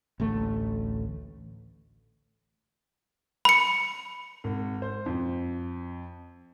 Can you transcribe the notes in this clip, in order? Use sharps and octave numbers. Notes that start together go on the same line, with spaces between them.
A1 D2 A3
B5 C#7
G#1
C5
F2